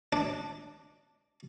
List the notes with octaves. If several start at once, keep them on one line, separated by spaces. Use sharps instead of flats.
D4